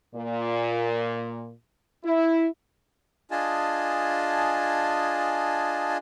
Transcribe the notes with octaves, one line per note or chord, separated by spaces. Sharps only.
A#2
E4
D4 F4 G#4 D#5 G#5 A5